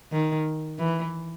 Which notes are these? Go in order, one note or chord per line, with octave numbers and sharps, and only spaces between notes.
D#3
E3